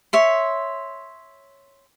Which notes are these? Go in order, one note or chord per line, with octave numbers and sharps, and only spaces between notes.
C#5 E5 C6